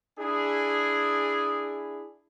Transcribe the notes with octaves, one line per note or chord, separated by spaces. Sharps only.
D4 E4 G#4